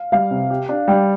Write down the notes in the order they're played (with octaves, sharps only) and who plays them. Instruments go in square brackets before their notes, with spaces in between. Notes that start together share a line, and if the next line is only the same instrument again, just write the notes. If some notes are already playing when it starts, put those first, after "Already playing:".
Already playing: [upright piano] F5
[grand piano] G3 [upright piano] F5
[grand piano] C3
G4
D4
[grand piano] G3 [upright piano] G5